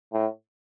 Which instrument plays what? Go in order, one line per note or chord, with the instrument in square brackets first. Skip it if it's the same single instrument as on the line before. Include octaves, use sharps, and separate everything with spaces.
[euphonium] A2